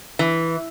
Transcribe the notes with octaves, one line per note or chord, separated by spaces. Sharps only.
E3